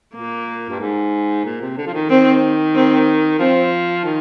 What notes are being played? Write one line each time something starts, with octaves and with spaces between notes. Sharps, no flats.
A#2 A#3
G2
G#2
A#2
C3
D3
F3
D#3
D#3 C4
C4
F3 C4
D#3